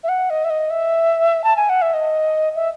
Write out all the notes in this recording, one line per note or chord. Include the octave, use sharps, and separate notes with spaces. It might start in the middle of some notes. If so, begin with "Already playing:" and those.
E5
F#5
D#5
E5
D#5
E5
A5
G#5
F#5
E5
D#5
E5